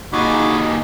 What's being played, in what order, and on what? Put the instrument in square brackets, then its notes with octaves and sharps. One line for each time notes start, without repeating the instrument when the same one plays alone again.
[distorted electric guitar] D#2 G#4 [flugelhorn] D#4 [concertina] F#4 B5 D6